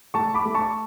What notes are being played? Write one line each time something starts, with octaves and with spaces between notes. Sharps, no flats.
A3 A5 C#6
B5 D6
A3
A5 C#6